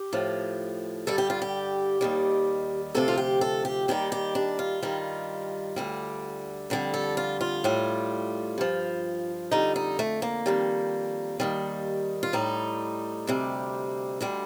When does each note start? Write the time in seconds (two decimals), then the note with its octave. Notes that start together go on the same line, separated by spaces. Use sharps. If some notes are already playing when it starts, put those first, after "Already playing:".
Already playing: G4
0.13 A2 F3
1.07 G2 D3 G3 A4
1.18 G4
1.30 F4
1.42 G4
2.01 D#2 D#3 G3
2.95 D2 C3 F3 A4
3.08 F4
3.18 G4
3.41 A4
3.65 G4
3.88 D#2 D#3 G3 G4
4.12 G4
4.35 D4
4.59 F4
4.83 G2 D#3 G3
5.76 D2 D3 G3
6.70 F2 D3 G3
6.94 A4
7.17 F4
7.41 F4
7.64 A2 G3
8.58 G2 F3
9.51 F2 D3 G3 D#4
9.76 D#4
9.99 A3
10.22 A#3
10.46 F2 D#3 G3
11.40 D#2 D#3 G3
12.23 F4
12.33 A2 G3 D#4
13.27 D2 C3 G3
14.21 D2 D3 G3